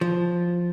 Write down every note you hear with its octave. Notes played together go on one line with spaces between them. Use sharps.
F3